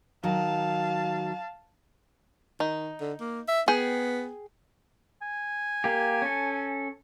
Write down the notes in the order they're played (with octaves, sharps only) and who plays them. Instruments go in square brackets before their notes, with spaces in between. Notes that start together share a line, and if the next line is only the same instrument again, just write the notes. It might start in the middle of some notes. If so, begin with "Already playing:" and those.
[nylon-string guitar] D#3 F#3 [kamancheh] F5 A5
[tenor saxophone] D#3 [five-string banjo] D#4
[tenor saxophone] D3
A#3
E5
[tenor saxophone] B3 [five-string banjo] G#4 G5
[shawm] G#5
[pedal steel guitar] A#3 G4
C#4 A4